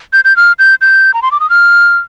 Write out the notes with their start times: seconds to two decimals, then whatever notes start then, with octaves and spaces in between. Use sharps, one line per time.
0.13 G6
0.25 G6
0.37 F6
0.59 G6
0.81 G6
1.14 A#5
1.22 C6
1.31 D6
1.40 D#6
1.50 F6